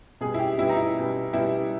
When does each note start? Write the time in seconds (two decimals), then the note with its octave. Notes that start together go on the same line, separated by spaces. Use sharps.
0.21 B2 G3 B3 G#4
0.34 E4
0.39 G4
0.58 B2 G3 B3 E4
0.69 D#4
0.77 E4
0.96 B2 G3 B3
1.33 B2 G3 B3 E4